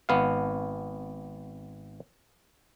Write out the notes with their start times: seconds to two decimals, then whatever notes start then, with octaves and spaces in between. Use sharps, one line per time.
0.09 G#1 B3 F5